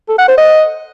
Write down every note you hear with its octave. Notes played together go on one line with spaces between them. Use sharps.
A4
F#5
C5
D#5